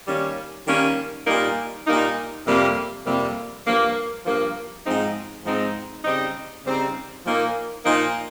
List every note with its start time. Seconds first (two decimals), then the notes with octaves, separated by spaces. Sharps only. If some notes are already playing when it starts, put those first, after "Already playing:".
0.06 D#3 G3 A#3 C#4
0.67 D#3 G3 A#3 C#4
1.27 A#2 G3 A#3 D#4
1.86 A#2 G3 A#3 D#4
2.46 F2 C3 G3 A#3
3.06 F2 C3 G3 A#3
3.66 G2 F3 A#3
4.25 G2 F3 A#3
4.85 G#2 F3 G#3 C4 D#4
5.45 G#2 F3 G#3 C4 D#4
6.05 C#3 G3 C4 D#4
6.65 C#3 G3 C4 D#4
7.24 A#2 F3 A#3 D#4
7.84 A#2 F3 A#3 D#4